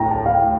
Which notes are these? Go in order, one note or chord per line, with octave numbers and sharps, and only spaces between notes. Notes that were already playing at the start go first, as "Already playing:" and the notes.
Already playing: A2 G5 A#5
A5
F5
G5